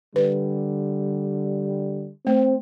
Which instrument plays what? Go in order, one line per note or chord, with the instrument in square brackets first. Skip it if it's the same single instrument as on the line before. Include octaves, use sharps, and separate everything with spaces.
[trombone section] D3 G3 [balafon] B4
[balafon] A3 [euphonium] C4